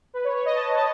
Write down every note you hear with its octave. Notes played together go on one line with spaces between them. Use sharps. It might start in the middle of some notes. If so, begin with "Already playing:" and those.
B4
C#5
C#5
D#5
A5
A5